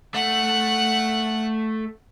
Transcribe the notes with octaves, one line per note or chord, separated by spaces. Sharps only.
A3 F#5 F#6